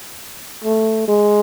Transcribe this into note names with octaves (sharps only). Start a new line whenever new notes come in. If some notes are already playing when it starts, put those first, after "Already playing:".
A3
G#3